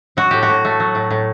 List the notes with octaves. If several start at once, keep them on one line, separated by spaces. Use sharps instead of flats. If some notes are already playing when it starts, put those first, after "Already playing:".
F#3 F#4
A2 G4
F#4
A2
A3
F#3
A2
A2